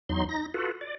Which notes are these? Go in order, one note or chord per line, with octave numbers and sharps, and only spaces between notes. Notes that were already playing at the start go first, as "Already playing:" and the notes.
E2 F#3 D#4 C6
D#4 A#6
F4 F#4 A4 B4
D5